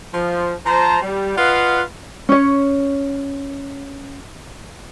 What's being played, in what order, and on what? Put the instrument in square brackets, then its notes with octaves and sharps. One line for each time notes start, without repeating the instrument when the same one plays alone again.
[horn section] F3
F3 C5 A5 A#5
G3
F4 B4 D#5 F5 F#5
[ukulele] C#4 C#5